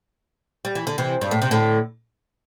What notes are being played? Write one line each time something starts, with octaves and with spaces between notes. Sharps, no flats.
G3
E3
D3
C3 E3
G2
A2
C3
A2 D3